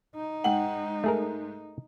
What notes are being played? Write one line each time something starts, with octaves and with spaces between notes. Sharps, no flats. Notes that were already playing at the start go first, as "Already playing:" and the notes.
D#4
G#2 F#5 G5 F#7
A3 G#4 A#4